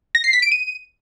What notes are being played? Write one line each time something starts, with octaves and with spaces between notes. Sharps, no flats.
A#6
C7
B6
D7
D#7